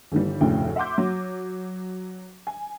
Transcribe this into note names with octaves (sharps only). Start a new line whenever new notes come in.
G1 D#3 E3 G3
F1 D2 A2 C#3 G5
E5 F#5 C6 D6 G6
F#3
G#5